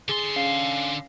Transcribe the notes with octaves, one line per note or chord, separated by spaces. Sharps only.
D3 G#4 C6
C#4 F5 C7